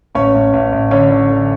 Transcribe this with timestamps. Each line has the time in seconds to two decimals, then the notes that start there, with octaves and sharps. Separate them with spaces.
0.15 A1 C#4 C#5
0.34 A1
0.53 A1
0.72 A1
0.91 D3 C#4 C#5
1.10 D3
1.30 D3